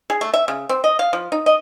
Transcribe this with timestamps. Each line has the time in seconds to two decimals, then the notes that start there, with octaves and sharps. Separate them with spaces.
0.10 G#4
0.21 A3
0.34 E5
0.48 C#3
0.69 C4
0.84 D#5
0.99 F5
1.13 F3
1.32 D#4
1.46 D#5